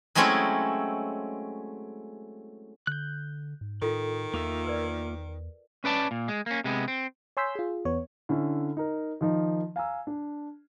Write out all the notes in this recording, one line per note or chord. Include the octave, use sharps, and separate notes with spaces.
F#3 G#3 A3 C4 C#4 E4
D3 F#6 G6
G#2
A2 D#3 F4 A4
E2 A#3 F4 E5 C#6
A#4 B4 D5
C#4 B4 D5 A5
A#2
G#3
A#3 C#4
C3 G#3 B3
C4
C#5 G#5 C6 E6 G6 B6
F4 G#4
E2 B3 C#5
D3 C#4 E4
D#4 A#4
D#3 F3 D#4
F5 G#5 A#5 E6
D4